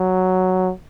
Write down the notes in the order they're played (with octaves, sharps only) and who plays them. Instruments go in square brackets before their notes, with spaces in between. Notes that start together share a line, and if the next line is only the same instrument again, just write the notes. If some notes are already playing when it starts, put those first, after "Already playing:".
Already playing: [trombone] F#3